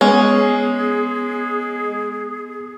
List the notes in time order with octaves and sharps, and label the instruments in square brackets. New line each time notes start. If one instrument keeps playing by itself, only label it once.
[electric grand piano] G#3 [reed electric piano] B3 [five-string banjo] C#4 [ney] G#4